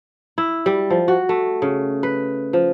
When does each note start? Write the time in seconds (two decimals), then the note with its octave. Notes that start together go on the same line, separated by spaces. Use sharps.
0.38 E4
0.66 G3
0.90 F3
1.08 F#4
1.29 A3
1.62 C#3
2.03 B4
2.53 F3